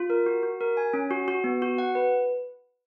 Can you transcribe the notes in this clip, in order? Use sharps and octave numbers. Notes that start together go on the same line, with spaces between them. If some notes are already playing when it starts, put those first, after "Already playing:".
Already playing: F4
A#4
F#4
F#4
A#4
G#5
C#4
F#4
F#4
B3
F#4
F#5
B4